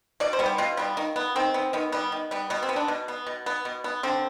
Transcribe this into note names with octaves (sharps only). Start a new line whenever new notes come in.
B2 D5
C5
G3 B3
G4
B2 F4
G3 B3
D#3
B3
D#3 C4
B3
D#3 B3
G3 B3
D#3
G3 B3
B2 B3
C4
B3
D4
B2
B3
B2
B3
B2
B3
D3 C4